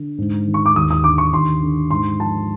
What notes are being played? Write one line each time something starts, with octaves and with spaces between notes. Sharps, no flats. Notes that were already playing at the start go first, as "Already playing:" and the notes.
Already playing: D3
G#2
D#3
C#6
D6
D#2 D#6
D#6
D3 D6
C#6
D#2 C6
D3
G#2 C6
F3 A5